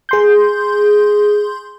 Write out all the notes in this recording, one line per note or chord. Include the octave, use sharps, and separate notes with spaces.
G#4 C6 G6